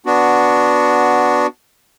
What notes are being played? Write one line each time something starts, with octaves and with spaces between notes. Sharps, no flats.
B3 D4 F#4